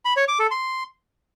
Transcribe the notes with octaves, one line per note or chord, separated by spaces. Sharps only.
B5
C#5
D6
A4
C6